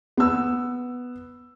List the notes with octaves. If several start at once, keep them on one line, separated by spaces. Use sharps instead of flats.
B3 E6